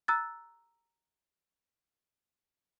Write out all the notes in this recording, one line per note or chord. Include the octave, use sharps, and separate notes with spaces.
A#5 E6 F#6 A6